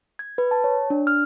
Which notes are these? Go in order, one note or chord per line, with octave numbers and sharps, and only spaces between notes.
G#6
B4
A5
C#5
D4
F6